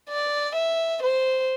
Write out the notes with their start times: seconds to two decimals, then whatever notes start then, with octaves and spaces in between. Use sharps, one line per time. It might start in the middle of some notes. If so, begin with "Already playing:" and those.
0.09 D5
0.56 E5
1.03 C5